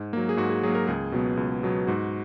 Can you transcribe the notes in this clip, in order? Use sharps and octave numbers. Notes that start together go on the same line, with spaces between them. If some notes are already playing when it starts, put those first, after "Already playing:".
Already playing: G#2
F#3 A#3
G#4
G#2 F#4
G#4
F#3 A#3 G#4
F#4 A#4
C#2 G#4
B2 F#3 B3
C#2
B2 F#3 B3
G#2 F#4